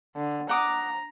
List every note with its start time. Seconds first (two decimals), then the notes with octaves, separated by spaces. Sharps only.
0.16 D3
0.49 F#5 A#5 D6 D#6